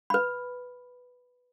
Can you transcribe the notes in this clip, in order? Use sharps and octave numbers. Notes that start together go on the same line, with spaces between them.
B4 B5